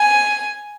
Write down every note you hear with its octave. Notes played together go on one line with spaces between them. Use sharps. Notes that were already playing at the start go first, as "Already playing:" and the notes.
Already playing: G#5